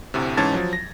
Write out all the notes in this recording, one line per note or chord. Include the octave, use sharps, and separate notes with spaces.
D2 A2 C3
G#2 E3 C#4 A5 G#6 A6
F3 F#3
A#6